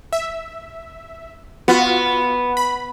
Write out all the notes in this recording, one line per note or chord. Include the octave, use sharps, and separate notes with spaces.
E5
B3 F4 F#4
B5